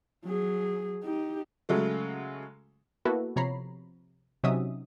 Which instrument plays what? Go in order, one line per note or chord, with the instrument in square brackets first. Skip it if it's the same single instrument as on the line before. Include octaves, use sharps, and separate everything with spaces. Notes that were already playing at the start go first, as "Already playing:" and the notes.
[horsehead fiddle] F#3 G#4
D#4 G4
[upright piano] C#3 F#3 G#3 A3
[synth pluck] A#3 B3 E4 F#4 A4 B4
C3 F3 C#5 A#5 B5 C7
C3 F#3 C#4 D#4 E5 D#6